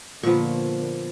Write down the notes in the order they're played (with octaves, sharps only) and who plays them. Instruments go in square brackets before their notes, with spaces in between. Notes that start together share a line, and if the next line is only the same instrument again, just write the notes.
[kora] A#2 B3 [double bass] D3 A#3 [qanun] F3 C#6